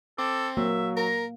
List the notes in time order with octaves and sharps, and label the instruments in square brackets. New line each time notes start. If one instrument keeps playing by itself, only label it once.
[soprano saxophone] C4 [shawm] A4 [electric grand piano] D6
[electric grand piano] F#3 [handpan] A#3 [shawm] E5
[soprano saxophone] A#4 [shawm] A#5